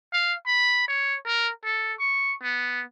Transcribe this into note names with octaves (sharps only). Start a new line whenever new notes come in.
F5
B5
C#5
A#4
A4
C#6
B3